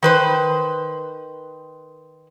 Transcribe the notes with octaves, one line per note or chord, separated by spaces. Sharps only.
D#3 B4 C5